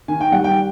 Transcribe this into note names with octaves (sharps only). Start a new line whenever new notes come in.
D#3 G#5
G5
G3 F#5
G5